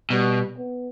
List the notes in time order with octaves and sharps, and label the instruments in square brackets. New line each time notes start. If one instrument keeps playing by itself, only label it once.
[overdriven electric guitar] B2 [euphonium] G3
[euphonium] B3